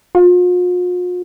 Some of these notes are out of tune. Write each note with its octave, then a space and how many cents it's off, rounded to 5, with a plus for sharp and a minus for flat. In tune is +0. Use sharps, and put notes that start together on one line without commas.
F4 +45